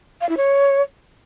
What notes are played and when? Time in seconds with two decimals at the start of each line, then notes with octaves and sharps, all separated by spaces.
0.21 F5
0.29 E4
0.37 C#5